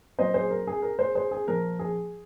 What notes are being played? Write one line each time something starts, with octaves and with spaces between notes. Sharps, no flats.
A#2 F#3 C4 C5 D#5
G#4 C5
A#4
G#4
A#4
G#4 C5
G#4 C5
G#4
A#2 F3 A#3 A#4
G#4